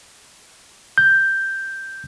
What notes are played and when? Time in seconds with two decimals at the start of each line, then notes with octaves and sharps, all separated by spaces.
0.98 G6